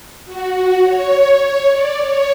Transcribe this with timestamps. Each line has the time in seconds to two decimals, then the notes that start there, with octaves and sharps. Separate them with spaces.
0.25 F#4
0.53 F#4
0.83 C#5
1.40 C#5
1.69 D5
1.99 C#5